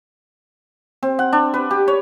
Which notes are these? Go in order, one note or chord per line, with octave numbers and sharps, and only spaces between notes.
C4
F#5
D4
B4
G4
C#5